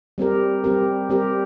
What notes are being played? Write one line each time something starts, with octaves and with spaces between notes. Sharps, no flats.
G3 C4 G4 A#4
G3 C4 G4 A#4
G3 C4 G4 A#4